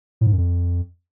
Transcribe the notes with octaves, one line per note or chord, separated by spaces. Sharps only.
A2
G#2
F#2
F2